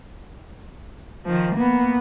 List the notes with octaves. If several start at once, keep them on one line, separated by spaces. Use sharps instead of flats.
D#3 F3
A#3 B3